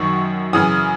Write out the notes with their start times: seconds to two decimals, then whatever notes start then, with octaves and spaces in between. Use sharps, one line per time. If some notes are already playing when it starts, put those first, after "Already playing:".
Already playing: F#2 D#3 F#3 C#6
0.53 F#2 C#3 E3 D#6